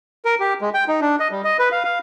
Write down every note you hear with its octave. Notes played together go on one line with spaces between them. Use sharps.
A#4
G4
G#3
G5
D#4
D4
D#5
G3
D#5
B4
F5
F5